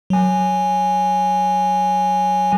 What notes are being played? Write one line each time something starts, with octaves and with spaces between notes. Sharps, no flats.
F#3 G#5